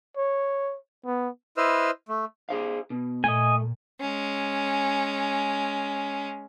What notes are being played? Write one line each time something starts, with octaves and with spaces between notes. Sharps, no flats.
C#5
B3
E4 B4 C5 D#5 E6 F6
A3
G#4 C5 F5
B2
A#2 A3 D#5 G#5
G#3 C#4